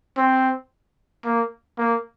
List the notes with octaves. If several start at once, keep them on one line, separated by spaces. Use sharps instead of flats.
C4
A#3
A#3